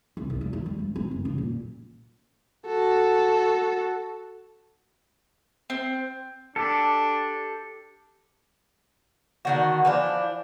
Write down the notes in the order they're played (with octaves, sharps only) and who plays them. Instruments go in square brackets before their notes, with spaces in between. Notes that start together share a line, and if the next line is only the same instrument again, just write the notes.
[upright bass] C2
C2
E2
D#3
G3
G2
C4
F#1
C#3
A#2
[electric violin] F#4 A4
[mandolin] C4
[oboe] D4 [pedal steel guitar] G4 A4
[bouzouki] D3 D#3 F#4
E3 F3 D4